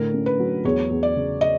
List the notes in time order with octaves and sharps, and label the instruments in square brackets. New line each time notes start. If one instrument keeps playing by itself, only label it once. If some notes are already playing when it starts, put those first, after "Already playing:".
Already playing: [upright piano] A2 D3 [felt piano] A#4
[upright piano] C#4
[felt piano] B4
[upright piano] F#3
[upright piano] E2 [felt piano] C#5
[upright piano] E2
[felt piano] D5
[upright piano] C#3
[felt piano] D#5